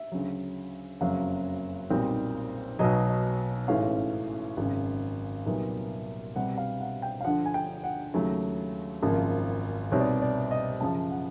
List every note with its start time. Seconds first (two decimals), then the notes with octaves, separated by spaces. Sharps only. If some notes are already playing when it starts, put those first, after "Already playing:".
Already playing: E5
0.12 D2 C#3 F#3
1.01 F#1 F2 C#3 F#3 F5
1.90 B1 A#2 G3 C4 D#4
2.79 B1 B2 F#3 D#5
3.09 D#5
3.68 A1 G#2 E3 A3 C#4 F5
4.57 G#1 F#2 C#3
5.46 C2 A#2 F#3 B3 D#4
6.36 C2 B2 G3 C4 F#5
6.58 F5
6.80 F#5
7.02 G5
7.21 F5
7.24 D2 D3 F3 F#5
7.46 G#5
7.54 G5
7.83 F#5
8.14 D#2 C#3 F#3 A3
9.02 G#1 F#2 C#3 F3 A#3
9.92 C2 B2 G3 C4 D#4 C#5
10.00 D5
10.07 C#5
10.22 D5
10.51 D#5
10.81 F#2 C#3 F3 A5
11.10 F#5